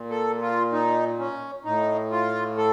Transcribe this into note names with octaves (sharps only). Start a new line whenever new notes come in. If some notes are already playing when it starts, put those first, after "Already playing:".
Already playing: A#2
A4
F4
D#4
C#4
A2 D#4
F4
A4